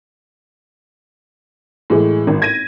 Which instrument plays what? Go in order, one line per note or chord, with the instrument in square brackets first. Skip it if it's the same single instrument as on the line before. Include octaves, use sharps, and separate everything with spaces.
[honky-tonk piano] A2 E3 G#3
G#1
G#6 A#6 D#7